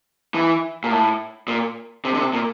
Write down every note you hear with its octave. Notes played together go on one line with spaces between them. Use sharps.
E3
A#2
A2
A#2
C3
D3
C3
A#2